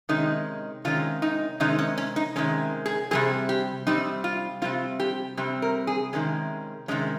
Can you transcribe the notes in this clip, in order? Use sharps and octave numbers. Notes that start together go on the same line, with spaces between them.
C3 D#3 G#3 C#4 D#4
C3 D#3 G#3 C#4 F4
D#4
C3 D#3 G#3 C#4 D#4
C#4
C#4
D#4
C3 D#3 G#3 C#4
G#4
C3 G3 C4 G#4
G4
C3 G3 C4 D#4
F4
C3 G3 C4 F4
G4
C3 G3 C4
A#4
G#4
C3 D#3 G#3 C#4
C3 D#3 G#3 C#4